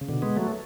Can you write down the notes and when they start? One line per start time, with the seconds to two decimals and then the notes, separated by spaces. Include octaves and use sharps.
0.01 C#3
0.09 B2 D3
0.22 G#3 B3
0.36 F#3 A3